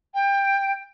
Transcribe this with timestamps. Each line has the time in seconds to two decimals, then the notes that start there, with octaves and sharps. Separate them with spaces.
0.14 G5